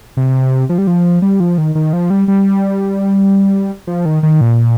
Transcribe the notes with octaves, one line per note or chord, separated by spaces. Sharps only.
C3
F3
G3
F3
G3
F3
D#3
D#3
F3
G3
G3
F3
D#3
D#3
A#2